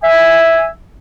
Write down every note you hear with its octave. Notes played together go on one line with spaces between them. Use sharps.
E5 G#5